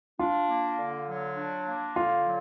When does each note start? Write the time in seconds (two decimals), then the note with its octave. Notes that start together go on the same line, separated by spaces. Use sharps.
0.19 D4 F4
0.48 A#3
0.78 D3
1.08 F#3
1.37 D4
1.67 A#3
1.96 D3 F4
2.25 F#3